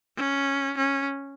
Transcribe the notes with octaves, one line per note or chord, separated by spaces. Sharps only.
C#4
C#4